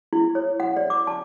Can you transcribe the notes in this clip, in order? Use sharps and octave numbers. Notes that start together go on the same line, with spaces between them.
E4
C#5
F#5
D5
D6
A5